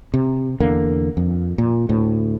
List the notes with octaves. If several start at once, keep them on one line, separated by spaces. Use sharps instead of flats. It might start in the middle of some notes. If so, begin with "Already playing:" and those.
C3
E2 D3 A#3
F2
A#2
D2 A2